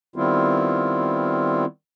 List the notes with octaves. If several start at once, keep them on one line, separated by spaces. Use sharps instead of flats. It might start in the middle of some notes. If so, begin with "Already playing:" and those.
D#3 G3 B3 C4 E4 F4